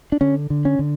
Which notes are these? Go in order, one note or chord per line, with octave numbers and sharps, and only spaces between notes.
D4
D3 C#4
D3
C#4
D3